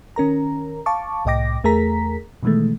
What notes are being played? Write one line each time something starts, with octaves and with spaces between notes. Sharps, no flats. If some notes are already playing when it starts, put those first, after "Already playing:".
D#3 C#4 A#4 A#5
F5 A5 C#6 D6
C2 A2 D#5 G5 D6 A#6
E2 A3 G#4 A#4 A#5 B6
B2 D#3 E3 G#3 A3